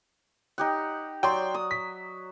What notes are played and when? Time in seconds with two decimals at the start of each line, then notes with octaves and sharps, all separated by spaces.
0.58 D#4 G4 F#5
1.23 F#3 D5 G5 C6
1.55 D#6
1.71 B6